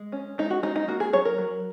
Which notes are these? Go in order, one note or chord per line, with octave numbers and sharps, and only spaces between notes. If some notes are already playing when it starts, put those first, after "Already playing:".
Already playing: G#3
C#4
G#3 D#4
F#4
G#3 D#4
D#4
A#3 F#4
G#4
F#3 C#5
A#4
F#3